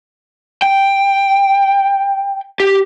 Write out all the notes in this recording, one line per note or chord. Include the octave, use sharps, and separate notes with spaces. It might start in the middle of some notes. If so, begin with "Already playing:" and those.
G5
G4